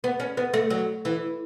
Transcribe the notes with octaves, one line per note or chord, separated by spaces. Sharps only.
B3
C#4
B3
A3
F#3
E3